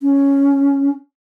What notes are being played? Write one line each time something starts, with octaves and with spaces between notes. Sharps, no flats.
C#4